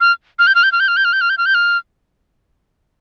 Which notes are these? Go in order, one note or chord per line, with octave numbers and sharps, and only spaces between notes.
F6
F6
G6
F6
G6
F6
G6
F6
G6
F6
G6
F6
G6
F6
G6
F6